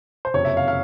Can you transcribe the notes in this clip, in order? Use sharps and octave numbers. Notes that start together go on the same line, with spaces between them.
C5
F#1 F2 C3 C#5
E5
F5
F5